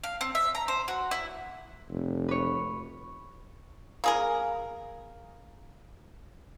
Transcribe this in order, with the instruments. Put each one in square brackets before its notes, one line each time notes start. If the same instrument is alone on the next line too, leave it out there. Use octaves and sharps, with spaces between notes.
[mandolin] F5
C4
E5
A#5
C5
F#4
E4
[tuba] F1
[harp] B4 C#5
[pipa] A#3 G#4 A#4